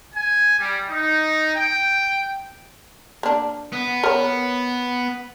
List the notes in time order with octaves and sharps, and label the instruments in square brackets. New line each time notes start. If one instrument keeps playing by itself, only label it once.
[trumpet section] G#5
G3
D#4
G5
[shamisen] A#3 D4
[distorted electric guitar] B3
[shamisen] A#4 C#5